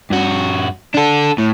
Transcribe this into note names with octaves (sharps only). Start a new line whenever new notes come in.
G2 F#4
D4 A4
A2